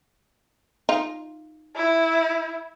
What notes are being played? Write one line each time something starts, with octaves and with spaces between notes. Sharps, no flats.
D#4 F4
E4